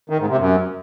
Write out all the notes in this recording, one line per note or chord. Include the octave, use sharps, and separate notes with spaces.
D#3
G#2
C3
F#2